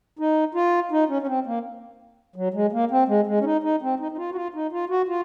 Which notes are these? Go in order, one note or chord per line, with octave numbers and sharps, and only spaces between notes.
D#4
F4
D#4
C#4
C#4
C4
A#3
F#3
G#3
A#3
C4
G#3
G#3
C#4
D#4
D#4
C4
D#4
D#4
F4
F#4
F4
D#4
F4
F#4
F4